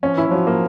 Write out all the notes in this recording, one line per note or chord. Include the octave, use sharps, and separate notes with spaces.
F3 C#4
E3 E4
F3 F#3
A#3